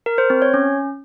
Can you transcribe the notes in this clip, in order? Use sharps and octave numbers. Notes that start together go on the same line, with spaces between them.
A#4
C5
C4
C#5
C#4